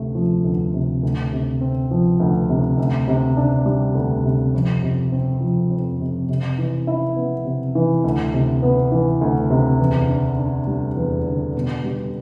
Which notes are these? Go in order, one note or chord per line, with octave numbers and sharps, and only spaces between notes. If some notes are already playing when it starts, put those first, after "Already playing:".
Already playing: D2 C3 A3
F3
D2
C3
D2
C3
C4
F3
D2
C3
D2
C3
D4
G3
D2
C3
F2
C3
C4
F3
F2
C3
C3
E3
E4
B3
C3
E3
D2
C3
B3
E3
D2
C3
E2
D3
D4
G3
E2
D3
B2
G3